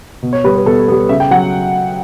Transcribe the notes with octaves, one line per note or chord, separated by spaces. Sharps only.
B2
C#5
G3 B3 B4
B4
B2 A4
G3 B3
C#3 E5
G5
F#3 F#5